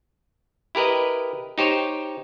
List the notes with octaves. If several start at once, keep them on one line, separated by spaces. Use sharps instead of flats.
E4 G4 A#4 B4 D#5
D#4 G4 C5 C#5